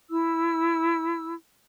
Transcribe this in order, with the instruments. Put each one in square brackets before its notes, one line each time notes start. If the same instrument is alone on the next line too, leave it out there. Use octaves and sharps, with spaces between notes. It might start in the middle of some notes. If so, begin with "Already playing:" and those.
[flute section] E4 E6